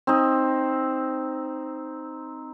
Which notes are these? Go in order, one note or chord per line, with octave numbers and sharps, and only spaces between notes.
C4 D#4